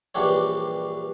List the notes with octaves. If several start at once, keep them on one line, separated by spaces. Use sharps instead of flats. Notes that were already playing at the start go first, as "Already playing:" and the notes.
A#1 G2 E3 D4 G4 C#5